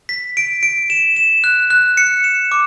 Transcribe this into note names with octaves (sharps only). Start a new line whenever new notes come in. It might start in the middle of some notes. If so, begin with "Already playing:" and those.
B6
D7
D7
E7
E7
F#6
F#6
C#7
E7
D6